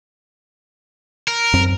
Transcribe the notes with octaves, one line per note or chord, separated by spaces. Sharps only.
A#4
F#2 C4